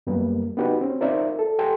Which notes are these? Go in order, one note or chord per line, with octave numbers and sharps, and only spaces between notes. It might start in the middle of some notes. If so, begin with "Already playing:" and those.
F#2 G3 A#3 B3
B3 D4 D#4 F#4 G4 B4
C4 C#4
D#4 F4 A#4 C5 D5 E5
A4
G4 A4 G5 G#5 C6